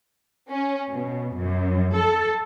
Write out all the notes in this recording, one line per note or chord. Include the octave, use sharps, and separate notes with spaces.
C#4
B2
F#2
A4